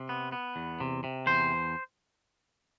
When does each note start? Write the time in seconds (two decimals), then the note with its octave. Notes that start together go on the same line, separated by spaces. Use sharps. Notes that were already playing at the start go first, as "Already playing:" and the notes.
Already playing: C3
0.09 B3
0.32 B3
0.56 E2
0.80 C3
1.04 C3
1.26 E2 C5